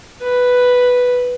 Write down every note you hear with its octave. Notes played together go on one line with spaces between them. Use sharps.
B4